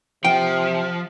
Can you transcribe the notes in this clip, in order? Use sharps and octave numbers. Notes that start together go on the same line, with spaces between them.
C3 F3 G5